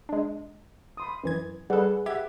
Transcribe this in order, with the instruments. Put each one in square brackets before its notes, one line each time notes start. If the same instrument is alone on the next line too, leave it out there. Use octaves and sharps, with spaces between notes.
[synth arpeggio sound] G#3 D4
[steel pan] B5 C6 D#6
[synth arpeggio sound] F#2 E3 G#6
[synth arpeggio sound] G3 A4 [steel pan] G#4 B4 F#5
[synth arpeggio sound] G4 G#6 [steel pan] E5 F#5